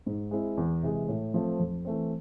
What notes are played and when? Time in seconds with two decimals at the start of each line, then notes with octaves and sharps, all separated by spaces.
0.06 G#2
0.31 G#3 C4 E4
0.57 E2
0.83 C3 E3 G#3
1.08 A2
1.34 F3 A3 C4
1.59 F2
1.85 E3 A3 C4